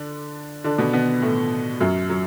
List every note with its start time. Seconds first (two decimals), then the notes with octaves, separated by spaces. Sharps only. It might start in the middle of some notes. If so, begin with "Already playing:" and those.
Already playing: D3 D4
0.64 D3 D4
0.78 B2 B3
0.93 B2 B3
1.22 A2 A3
1.80 F#2 F#3
2.10 F#3